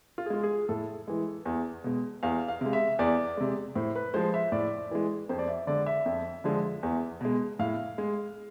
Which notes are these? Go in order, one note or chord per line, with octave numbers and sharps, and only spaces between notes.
F4
G#4
G#3 F4
G#4
A2 A4
E3 G#3
E2
B2 G#3
E2 F5
F5
C3 G#3
E5
E2 D5
C3 G#3
A2 C5
B4
F3 G#3 C5
E5
A2 D5
E3 G#3
F2 C5
D5
E5
D3 G#3 D5
E5
F2
D3 F3 G#3
E2
B2 G#3
A2 F5
G#3